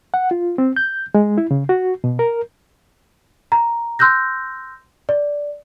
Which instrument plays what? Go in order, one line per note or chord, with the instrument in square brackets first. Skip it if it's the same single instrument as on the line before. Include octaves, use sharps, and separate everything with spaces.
[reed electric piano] F#5
F4
C4
G6
G#3
E4
C#3
F#4
B2
A#4
[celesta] A#5
C6 E6 F#6 G6 A#6
D5